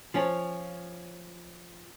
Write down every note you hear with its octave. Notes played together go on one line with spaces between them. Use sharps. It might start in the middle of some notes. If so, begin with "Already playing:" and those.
F3 C#4